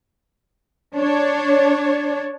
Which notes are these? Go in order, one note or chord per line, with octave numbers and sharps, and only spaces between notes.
D4 C#5